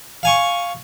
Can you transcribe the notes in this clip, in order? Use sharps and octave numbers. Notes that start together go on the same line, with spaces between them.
F5 G#5 C#6